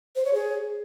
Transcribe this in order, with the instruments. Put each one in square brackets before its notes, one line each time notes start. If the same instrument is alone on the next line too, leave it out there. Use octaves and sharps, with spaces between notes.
[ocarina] C5
C#5
G#4